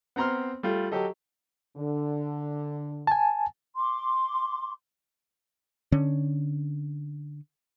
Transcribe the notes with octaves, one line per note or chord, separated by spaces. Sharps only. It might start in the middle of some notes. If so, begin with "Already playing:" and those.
B3 C4 A#5 C6 F6
G3 A3 F4
F#3 G4 A4 D#5
D3
G#5 A5
C6 D6
D3 C#4